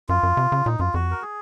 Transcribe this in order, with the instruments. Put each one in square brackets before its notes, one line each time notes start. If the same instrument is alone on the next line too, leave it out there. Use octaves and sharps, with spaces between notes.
[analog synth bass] F#2 [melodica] F4
[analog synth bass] F#2
C3
C#3
[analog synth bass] A#2 [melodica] D#4
[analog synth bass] F#2 [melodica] F4
[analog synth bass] F2 [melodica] F#4
[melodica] A#4
G#4